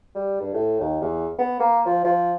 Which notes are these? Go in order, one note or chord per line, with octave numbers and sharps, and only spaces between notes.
G3
G2
A2
D#2
E2
B3
A#3
F3
F3